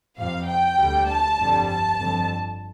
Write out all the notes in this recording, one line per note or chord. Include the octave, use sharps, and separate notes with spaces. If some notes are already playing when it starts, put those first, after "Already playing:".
F2 C3 F3 F5
G5
D2 D3 G3
A5
G1 F2 D3 G3
A5
G1 F2 D3